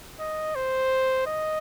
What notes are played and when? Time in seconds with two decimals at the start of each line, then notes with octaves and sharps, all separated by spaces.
0.20 D#5
0.55 C5
1.27 D#5